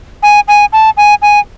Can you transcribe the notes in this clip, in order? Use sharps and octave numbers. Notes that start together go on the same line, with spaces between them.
G#5
G#5
A5
G#5
G#5